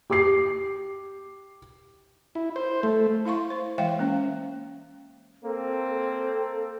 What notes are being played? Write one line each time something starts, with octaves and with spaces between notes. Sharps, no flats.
G4 D6 C7
E4
C5
A3
E4 F5 C6 C#6
C5
E3 G#3 C5 E5 F5 G5
A#3 C#4
A#3 C4 A4
A4